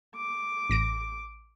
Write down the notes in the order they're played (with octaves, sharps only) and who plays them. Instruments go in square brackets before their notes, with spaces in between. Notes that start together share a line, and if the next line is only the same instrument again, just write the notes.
[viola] D6
[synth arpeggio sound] A1 A#6 D7